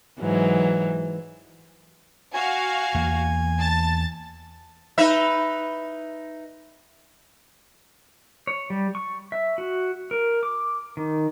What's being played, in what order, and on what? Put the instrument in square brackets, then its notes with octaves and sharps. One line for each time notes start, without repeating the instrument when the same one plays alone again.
[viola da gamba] G#2 E3 F#3
[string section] F#4 F5 [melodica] G#5
[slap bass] E2 A#3
[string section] A5 A6
[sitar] D#4 B4 E5
[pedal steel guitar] C#5
G3
C#6
E5
F#4
A#4
D6
D#3